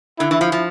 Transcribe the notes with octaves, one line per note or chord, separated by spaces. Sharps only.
D3 E4
E3
F3
F3